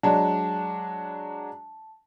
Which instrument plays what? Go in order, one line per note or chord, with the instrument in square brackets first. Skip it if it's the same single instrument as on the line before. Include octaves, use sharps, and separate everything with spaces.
[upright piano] F#3 G#3 D4 [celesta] A5